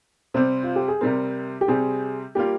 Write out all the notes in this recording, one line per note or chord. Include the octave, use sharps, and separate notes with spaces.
C3 G3 C4 C5
F4
G4
G#4
C3 G3 C4 A#4
G4
C3 G3 C4 G#4
G3 A#3 F4 G4